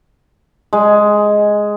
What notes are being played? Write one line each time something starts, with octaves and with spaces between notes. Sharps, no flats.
G#3